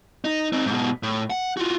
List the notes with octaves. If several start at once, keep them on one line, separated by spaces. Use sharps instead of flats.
D#4
C4 D#4
G#2 B2
A2
F#5
F4 F#4